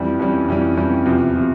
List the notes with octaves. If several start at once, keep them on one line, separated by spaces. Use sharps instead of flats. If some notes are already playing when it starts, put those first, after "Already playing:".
Already playing: F2 E3 G3
F2 E3 G3 C#4
F2 E3 G3 C#4
F2 E3 G3 C#4
E2 C3 F3
C3 F3